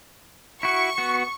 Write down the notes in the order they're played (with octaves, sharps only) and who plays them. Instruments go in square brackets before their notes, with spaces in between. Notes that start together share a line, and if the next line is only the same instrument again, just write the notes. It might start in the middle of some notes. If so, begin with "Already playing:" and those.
[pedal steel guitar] E4 F#4 [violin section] C#6
[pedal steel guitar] B3 F#4